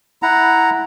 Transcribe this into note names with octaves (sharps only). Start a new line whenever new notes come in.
E4 F#5 A#5